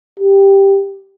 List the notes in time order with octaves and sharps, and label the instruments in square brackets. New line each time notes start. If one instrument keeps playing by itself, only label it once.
[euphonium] G4